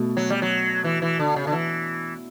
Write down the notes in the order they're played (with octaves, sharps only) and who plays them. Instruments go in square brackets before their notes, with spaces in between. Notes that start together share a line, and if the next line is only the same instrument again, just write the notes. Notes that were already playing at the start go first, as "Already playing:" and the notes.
Already playing: [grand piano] B2 A3
[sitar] F#3
G3
F#3
E3
E3
D3
C#3
D3
E3